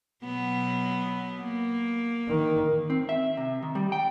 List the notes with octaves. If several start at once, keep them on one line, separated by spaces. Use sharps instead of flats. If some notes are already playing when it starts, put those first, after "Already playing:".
B2 F#3 B3
A#3
D#3
C4
E5
C3
D#3
G3
G5